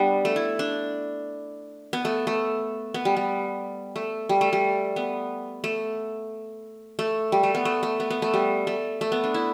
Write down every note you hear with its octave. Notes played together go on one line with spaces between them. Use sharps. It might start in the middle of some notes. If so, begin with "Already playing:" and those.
Already playing: G3 B3 D4
A3
E4
D4
B3
A3
A3
B3
G3
G3
A3
G3
A3
G3
B3
A3
A3
G3
A3
B3
A3
A3
B3
B3
A3
G3
A3
A3
B3
D4
E4